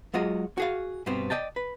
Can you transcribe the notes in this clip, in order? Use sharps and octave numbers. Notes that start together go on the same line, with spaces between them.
F#3 G#3 F4 F#4 D#5
F#4 G#4 F5
G2 B2 B3 C4
D5 D#5 G5 A5
B4